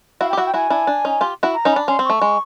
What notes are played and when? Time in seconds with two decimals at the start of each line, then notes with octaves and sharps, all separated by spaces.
0.21 E4 F#4 F5
0.29 G5
0.33 G4
0.37 E4 F#4 F#5
0.46 G5
0.54 E4 F#4 G#5
0.70 D4 E4
0.87 D4
1.05 C#4 D#4
1.21 F4 G4
1.43 E4 F#4
1.54 A#5
1.65 C#4 D#4
1.71 B5
1.76 D4
1.88 C#4 C6
1.99 C4
2.04 C#6
2.10 A3
2.22 G#3